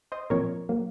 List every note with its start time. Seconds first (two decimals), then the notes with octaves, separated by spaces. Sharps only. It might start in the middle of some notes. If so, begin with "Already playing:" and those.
0.12 C5 D#5
0.30 A#2 F3 C4 A#4 C#5
0.69 F#3 A#3